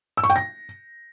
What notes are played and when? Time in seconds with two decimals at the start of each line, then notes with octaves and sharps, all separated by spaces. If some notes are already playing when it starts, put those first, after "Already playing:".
0.17 E6
0.24 C#6
0.30 G5
0.36 A#6